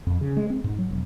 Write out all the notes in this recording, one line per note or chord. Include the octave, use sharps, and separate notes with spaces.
F2
C#3
G#3
C4
G#2
F#3
E1